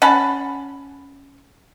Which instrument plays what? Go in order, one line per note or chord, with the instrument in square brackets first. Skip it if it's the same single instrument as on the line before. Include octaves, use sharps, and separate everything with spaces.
[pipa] C#4 F#5 A5 B5